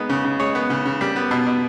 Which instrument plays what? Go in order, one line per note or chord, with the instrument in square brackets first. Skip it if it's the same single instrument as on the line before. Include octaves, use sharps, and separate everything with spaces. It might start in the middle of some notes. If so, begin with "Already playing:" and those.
Already playing: [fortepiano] G#3 B3 D#4
C#3
C#3
G#3 C#5
B3
C#3
C#3
G3
B3
B2
B2